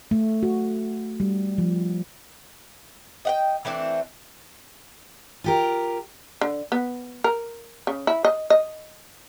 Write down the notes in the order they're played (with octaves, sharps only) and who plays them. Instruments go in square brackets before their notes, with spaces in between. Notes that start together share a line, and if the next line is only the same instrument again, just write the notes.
[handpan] A3
F#4
G3
F3
[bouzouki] D#5 F#5 G5
E3 A3 C4 D4
[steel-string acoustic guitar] F4 G4 A#4
[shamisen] D3
B3
A#4
C#3
E4
D#5
D#5